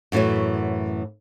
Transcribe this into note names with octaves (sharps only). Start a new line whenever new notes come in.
F#2 A2 E3 F#4 C#5